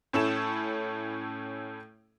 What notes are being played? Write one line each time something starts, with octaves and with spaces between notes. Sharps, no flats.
A2 C#4 E4 A4 E7